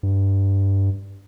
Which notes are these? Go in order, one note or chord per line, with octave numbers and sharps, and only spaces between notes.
G2